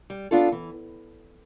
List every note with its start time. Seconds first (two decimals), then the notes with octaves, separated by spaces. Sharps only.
0.10 G3
0.31 B3 D4 F4 A4
0.52 E3